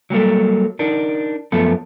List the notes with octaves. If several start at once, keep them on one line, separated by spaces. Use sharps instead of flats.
F#3 G3 A#3 A4
D4 D#4 A#4
F#2 F3 A3 B3 A4